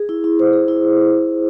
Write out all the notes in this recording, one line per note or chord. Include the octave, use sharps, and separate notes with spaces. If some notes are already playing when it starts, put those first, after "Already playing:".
Already playing: G#4
E4
E4
C5
G#4
E4